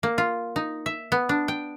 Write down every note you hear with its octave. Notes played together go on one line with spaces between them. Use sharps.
A#3
F4
D#4
E5
B3
D4
G5